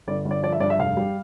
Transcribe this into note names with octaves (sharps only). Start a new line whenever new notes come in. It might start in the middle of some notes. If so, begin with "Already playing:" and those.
G1 D5
G1
D5
F3 D5
E5
G2 D5
E5
F1 F5
G3